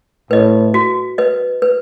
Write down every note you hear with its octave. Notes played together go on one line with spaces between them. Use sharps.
A2 B4 D#5
F#4
B4 D#5
B4